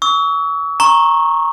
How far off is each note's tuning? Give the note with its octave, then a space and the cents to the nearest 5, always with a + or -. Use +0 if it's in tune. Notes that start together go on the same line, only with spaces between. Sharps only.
C#6 +40 E6 -35
A#5 +0 C#6 -20